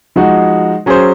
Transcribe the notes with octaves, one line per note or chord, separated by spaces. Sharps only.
F3 G#3 D#4 F#4
F#3 C#4 G#4 C5